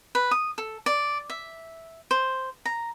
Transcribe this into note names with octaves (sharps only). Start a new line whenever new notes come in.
B4
D#6
A4
D5
E5
C5
A#5